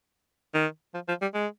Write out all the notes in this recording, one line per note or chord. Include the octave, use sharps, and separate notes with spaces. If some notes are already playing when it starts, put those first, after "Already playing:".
D#3
F3
F3
G3
G#3